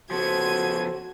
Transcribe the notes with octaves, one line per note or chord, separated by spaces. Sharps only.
C#3 F3 B3 F#4 A4 C5 G#6 D#7